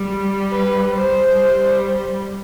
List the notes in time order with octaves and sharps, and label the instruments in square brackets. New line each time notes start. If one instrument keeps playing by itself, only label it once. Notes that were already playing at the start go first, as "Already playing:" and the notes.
Already playing: [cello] G3
[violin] B4
C5
[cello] G3